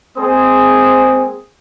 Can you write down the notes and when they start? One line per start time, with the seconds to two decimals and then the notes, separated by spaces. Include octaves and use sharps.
0.17 G#3 A#3 C4 G#4 C5 D#6